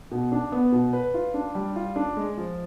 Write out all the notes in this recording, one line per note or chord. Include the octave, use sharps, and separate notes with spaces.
B2
D4
B3
B2
B4
F4
D4
G3
F4
D4
G#3
F3